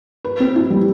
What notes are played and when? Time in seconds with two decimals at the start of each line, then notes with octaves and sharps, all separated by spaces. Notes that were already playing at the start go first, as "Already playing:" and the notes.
0.25 B4
0.40 C4
0.56 E4
0.70 G3